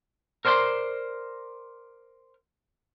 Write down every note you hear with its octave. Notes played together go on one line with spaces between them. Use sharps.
A#4 C5 D5 G#5 C6